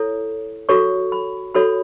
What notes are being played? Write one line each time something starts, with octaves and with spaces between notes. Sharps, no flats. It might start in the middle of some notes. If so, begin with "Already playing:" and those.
Already playing: E4 A4 C#5
F#4 A4 C#5 C#6
B5
F#4 A4 C#5 B5